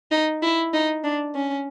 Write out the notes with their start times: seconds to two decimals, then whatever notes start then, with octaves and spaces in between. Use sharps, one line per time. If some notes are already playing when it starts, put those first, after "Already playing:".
0.11 D#4
0.42 E4
0.73 D#4
1.04 D4
1.35 C#4